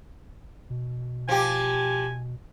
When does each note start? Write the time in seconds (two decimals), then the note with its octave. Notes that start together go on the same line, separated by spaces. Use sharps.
0.70 B2
1.29 F3 G4 G#5